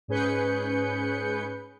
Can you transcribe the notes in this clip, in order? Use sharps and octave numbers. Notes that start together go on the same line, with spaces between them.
G#2 C#4 G#4 B4 G6 C#7